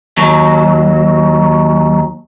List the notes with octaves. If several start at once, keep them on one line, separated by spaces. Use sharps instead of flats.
D#2 F#3